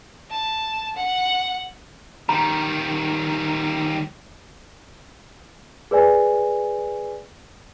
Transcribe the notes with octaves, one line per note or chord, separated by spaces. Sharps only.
A5
F#5
D#3 G3 A#5
G#4 B4 D5 G#5